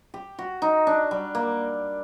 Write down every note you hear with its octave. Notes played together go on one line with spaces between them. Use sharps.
G4
F#4
D#4
D4
G3
A#3